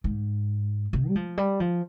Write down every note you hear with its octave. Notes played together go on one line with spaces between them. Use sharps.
G#2
C3
G3
F3
G3
F3